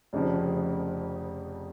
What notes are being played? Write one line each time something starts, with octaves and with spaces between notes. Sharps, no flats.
F1 F2 C#3 F3